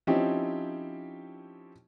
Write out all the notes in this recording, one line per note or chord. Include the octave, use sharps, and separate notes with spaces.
F3 C4 C#4 D#4 E4 G4